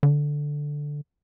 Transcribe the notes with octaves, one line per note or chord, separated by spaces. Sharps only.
D3